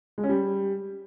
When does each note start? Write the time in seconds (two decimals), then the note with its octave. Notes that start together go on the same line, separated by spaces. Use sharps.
0.18 G#3
0.23 C#4
0.29 G3